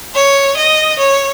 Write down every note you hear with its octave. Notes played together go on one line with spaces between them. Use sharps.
C#5
D#5
C#5